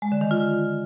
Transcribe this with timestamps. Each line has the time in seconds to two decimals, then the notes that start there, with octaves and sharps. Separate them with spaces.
0.02 G#3
0.12 D3
0.21 D#3
0.31 F4